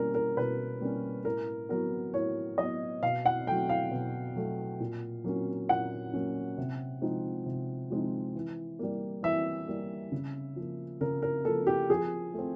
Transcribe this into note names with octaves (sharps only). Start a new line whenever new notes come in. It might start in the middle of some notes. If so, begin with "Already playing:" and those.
Already playing: B2 G3 A#3 C#4 A#4
A#4
B2 B4
G3 A#3 C#4
A2 A#4
F#3 B3 A#4
A2 C#5
F#3 B3 D#5
B2 F5
F#5
F#3 A3 G5
F5
B2
F#3 A3
A#2
F#3 A#3 C#4
A#2 F#5
F#3 A#3 C#4
C3
F3 G#3 C4 D#4
C3
F3 G#3 C4 D#4
E3
G3 A#3
E3 E5
G3 A#3
C#3
F3 A#3
C#3 A#4
A#4
F3 A#3 A4
G4
F3 G#4
A3 C4